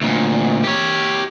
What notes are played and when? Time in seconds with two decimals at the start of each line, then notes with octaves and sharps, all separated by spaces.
0.02 D2 A#2
0.64 G4 C#5